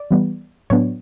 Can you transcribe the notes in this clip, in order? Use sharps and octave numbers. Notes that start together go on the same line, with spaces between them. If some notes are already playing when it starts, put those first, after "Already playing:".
Already playing: D5
E3 G3 B3
A2 F#3 B3 D4 C#5